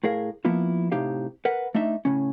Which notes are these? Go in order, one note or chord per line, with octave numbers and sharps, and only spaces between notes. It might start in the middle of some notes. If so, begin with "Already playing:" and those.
A2 G#4 A#4 F5
F3 A#3 B3 E4 F4
A2 C3 D#4 G4 F5
A#4 B4 F#5
A3 D4 D#4 E5
A2 C#3 C#4